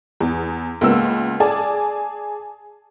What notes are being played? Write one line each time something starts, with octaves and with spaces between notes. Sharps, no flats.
E2
C#2 A#3 B3 E6
G#4 D5 G#5 A5